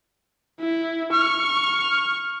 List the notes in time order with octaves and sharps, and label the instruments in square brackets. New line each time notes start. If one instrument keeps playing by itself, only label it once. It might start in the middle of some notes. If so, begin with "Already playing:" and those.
[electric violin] E4
[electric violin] C#6 [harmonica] F6